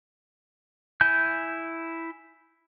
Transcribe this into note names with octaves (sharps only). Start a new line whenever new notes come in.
E4 G#5 G6